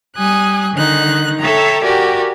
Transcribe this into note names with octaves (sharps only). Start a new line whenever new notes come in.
G3 G#5 D#6 F#6
D3 D#3 D#4 F#6
A4 C#5 E5 G5 A#5
F#4 G4 A#4 D5 G5 G#5